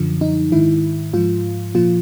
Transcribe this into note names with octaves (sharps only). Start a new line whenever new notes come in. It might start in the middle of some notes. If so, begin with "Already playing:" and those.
Already playing: F#2 D3 F3
D#4
G#2 D#3 E4
G#2 F3 F4
A#2 F3 F4